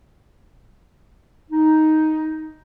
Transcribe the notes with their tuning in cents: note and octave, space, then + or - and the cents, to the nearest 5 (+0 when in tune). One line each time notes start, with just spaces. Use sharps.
D#4 +5